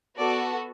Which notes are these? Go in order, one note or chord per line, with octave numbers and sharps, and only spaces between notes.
B3 F#4 A4 D5